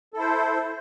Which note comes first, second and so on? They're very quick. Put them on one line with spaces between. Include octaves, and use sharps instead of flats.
A4 E4 C5